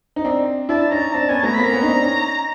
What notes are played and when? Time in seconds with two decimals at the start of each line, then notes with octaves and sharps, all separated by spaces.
0.16 D#4
0.25 C4 D4
0.69 D4 E4 A5
0.91 C#4 D#4 A#5
1.13 C4 D4 A5
1.28 B3 C#4 G#5
1.43 A3 B3 A#5
1.55 A#3 C4 B5
1.64 A#5
1.73 B3 C#4
1.83 D#4
1.88 C4 D4
2.03 C#4 D#4